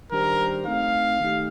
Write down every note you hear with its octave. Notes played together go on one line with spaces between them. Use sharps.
D#3 G3 D4 G4 A#4 C5
A3 C4 D#4 F5
D#3 A3 D#4 G4